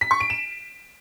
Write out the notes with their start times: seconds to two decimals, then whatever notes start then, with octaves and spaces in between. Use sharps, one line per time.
0.01 B6
0.11 C#6
0.20 D7
0.30 E7